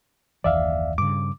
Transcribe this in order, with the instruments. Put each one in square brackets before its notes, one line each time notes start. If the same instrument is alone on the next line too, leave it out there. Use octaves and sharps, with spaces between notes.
[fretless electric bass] F#1 D#2 E3 [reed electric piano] D5 E5 F5
[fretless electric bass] G2 C#3 [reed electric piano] D6